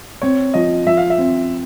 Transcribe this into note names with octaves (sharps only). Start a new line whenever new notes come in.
C4 C#5
F3 D#5
F3 E5
F5
E5
C4